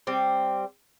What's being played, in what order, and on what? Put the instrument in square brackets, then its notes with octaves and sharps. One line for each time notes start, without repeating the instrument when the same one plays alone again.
[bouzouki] G3 C4